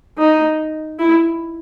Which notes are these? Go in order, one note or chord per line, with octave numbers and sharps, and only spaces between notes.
D#4
E4